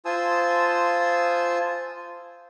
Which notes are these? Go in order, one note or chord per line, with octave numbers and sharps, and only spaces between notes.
F4 C5 G#5 A5 D#6 E6